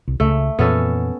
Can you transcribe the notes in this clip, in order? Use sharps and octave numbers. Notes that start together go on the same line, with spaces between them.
C2
C#2 C#3 A3
F2 A#2 E3 B3 C#4 A4